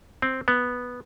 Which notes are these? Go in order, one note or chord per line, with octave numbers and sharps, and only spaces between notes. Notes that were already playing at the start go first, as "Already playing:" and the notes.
C4
B3